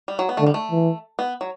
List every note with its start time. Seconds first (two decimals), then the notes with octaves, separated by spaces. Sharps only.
0.08 G3
0.19 F#3
0.29 B3
0.37 D3 A3
0.47 G3
0.54 A3
0.71 E3
1.19 B3
1.41 F#3